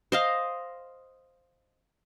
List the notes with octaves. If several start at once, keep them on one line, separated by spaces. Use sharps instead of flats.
C5 D#5 F5